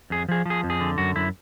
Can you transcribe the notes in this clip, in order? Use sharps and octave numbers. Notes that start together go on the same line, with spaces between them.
F2 G#4
F3 G#4
F3 G#4
F2
G#4
D3
F#2 F#4
F#2 E4